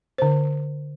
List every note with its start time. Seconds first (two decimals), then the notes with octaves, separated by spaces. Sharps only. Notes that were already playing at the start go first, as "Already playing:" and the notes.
0.18 D3 C5